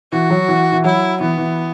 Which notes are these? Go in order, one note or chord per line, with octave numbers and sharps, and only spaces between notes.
E3 F#4
F#3
E3
E3
F#3 E4
E3 B3
E3